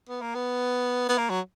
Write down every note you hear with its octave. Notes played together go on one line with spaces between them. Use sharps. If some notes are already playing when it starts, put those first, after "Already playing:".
B3
A#3
B3
B3
A#3
F#3